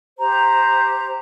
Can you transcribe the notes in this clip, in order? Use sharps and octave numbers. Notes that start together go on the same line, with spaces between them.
G4 C5 A#5